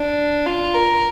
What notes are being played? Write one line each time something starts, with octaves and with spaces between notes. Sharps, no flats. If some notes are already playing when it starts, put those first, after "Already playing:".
Already playing: D4
F4
A#4